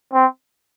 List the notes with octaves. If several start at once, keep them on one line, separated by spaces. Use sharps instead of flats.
C4